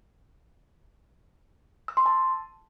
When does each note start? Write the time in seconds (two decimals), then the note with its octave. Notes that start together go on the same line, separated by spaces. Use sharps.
1.88 E6
1.97 C6
2.06 A5